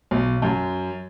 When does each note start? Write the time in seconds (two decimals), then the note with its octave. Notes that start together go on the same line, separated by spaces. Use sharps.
0.11 B1
0.42 F#2